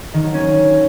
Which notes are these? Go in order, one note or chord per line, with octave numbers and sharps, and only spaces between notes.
D#3
F#3
C#4